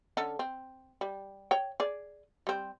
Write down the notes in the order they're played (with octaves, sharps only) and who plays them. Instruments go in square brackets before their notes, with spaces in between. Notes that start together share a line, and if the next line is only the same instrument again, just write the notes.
[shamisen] D3 C#4 A4
C4
G3
C#5 G5
G#4 D5
G3 C4